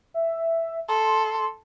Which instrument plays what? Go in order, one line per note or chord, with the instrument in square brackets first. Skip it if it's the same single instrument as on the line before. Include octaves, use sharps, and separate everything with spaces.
[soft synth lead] E5
[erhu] A4 [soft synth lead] C6